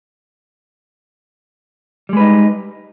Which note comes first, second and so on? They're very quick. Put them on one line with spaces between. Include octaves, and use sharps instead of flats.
G3 G#3 B4 D#4